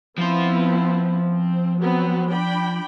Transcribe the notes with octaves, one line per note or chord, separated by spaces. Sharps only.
F3 B3 C4 E4 C5
C4
F#3 B3 C4
D4 G5 B5